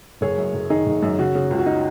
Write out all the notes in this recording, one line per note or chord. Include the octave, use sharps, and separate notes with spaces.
F#1 G#4 C#5
F#2
F#1
D#3 D#4 G#4
F#1
F#2
C#3 F#4
C#3
C#2
F#4
D#4